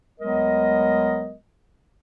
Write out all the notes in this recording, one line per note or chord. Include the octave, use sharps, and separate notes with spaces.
D2 F#3 G#3 B3 A#4 D#5